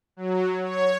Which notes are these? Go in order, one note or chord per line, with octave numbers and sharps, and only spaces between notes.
F#3
C#5